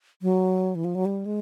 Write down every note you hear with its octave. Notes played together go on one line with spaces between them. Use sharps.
F#3
E3
F3
F#3
G3
G#3